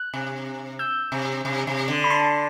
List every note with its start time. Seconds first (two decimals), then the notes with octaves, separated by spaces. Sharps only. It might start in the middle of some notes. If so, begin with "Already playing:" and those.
Already playing: F#6
0.13 C3
0.79 E6 G6
1.12 C3
1.45 C3
1.67 C3
1.88 D3
2.04 B5
2.10 A5 C6